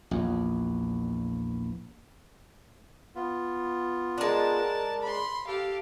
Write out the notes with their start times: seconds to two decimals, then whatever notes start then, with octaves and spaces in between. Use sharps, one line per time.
0.11 A#1 E2
3.16 B3 F4
4.18 G#3 D4 A#4 A5
5.03 B5 C6
5.47 G4 A4 F5